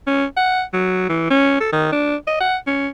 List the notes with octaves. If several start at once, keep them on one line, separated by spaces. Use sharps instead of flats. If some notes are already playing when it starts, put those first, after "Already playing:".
C#4
F#5
F#3
E3
C#4
A4
D#3
D4
D#5
F#5
C#4